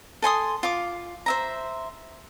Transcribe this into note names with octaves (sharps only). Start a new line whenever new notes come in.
A4 G#5 C6 D#6
F4 D6
C5 E5 A#5